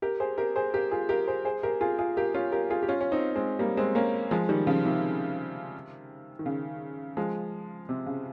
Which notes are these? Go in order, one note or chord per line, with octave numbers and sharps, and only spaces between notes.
G4 A#4
G#4 C5
G4 A#4
G#4 C5
G4 A#4
F4 G#4
G4 A#4
G#4 C5
G#4 C5
G4 A#4
F4 G#4
F4 G#4
G4 A#4
C#4 F4
G4 A#4
F4 G#4
G4
C#4 F4
C#4
C4 D#4
G#3 C4
G3 A#3
G#3 C4
A#3 C#4
F3 G#3
D#3 G3
C#3 F3
C3 D#3
D#3
C#3
F3 G#3
C3
C#3